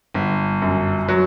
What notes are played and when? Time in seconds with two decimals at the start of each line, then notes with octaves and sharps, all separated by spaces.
0.14 G1
0.62 F#2
1.08 F#3